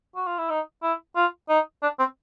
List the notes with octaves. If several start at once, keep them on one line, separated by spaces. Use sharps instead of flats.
F#4
F4
E4
D#4
E4
F4
D#4
D4
C4